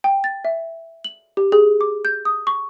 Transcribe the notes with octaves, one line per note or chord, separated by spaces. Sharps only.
G5
A6
E5
F#7
G4
G#4
D6
G6
D#6
C#6